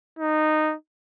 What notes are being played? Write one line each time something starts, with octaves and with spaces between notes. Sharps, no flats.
D#4